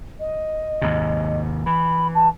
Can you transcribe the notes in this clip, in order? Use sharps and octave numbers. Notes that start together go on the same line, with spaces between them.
D#5
D#2 G#2 C3
E3 B5
A5